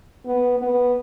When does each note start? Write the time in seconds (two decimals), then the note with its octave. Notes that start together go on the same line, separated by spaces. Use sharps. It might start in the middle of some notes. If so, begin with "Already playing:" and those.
0.25 B3
0.58 B3